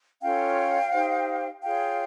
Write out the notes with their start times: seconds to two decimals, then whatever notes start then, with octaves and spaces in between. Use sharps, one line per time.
0.21 C#4 F4 A4 C#5 F5 G5
0.91 D#4 G4 C5
1.62 F4 G#4 C#5 F5 G5